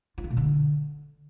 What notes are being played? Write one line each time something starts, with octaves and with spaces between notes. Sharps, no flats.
F4
A#3
B2
D3